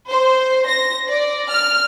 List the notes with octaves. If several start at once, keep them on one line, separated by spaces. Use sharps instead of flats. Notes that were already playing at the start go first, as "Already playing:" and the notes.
C5
A#6
D5
F6